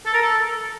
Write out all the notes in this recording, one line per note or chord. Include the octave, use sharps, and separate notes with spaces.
A4
A#4
A4